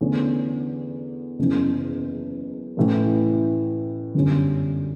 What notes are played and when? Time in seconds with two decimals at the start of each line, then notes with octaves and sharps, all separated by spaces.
0.01 E2 D3 A3 C#4
1.39 F#1 E2 C#3 E3
2.77 A1 A2 E3
4.14 G1 F#2 D3 G3 C#4